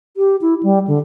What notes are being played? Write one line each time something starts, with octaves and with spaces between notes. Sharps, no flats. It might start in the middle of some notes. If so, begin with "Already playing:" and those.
G4
E4
G3
D3